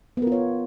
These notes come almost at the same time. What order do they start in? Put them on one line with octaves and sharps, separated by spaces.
B3 A#4 F4 C#5